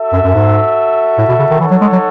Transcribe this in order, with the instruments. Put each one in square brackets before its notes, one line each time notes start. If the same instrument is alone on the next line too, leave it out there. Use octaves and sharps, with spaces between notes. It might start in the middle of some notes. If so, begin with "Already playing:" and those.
Already playing: [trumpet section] F#4 A4 E5
[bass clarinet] F#2
F#2
G#2
A2
B2
C#3
D#3
[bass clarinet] E3 [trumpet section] D#4 A4 C#5 F#5
[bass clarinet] F#3
G#3
F#3